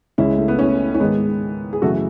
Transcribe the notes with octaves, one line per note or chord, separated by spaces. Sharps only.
C#2 C#3 G#3 C#4 E4
A3
B3
A3 C#4
C#4
G#2 D#3 G#3 B3
G#4
F#2 C#3 E3 A3 F#4 A4